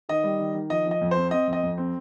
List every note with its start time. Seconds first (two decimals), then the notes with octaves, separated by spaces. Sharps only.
0.09 D#3 D#5
0.24 G3
0.39 D#3
0.54 D#3
0.70 F3 D#5
0.86 F3
0.91 D#5
1.01 F2
1.11 C5
1.16 C4
1.31 C4 D#5
1.48 F2
1.53 D#5
1.63 F2
1.78 C4